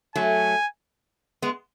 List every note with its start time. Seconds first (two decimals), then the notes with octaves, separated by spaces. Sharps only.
0.16 F#3 A3 G#5
1.42 G#3 B3